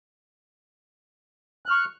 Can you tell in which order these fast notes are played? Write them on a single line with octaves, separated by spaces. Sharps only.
F#6 F6 C#6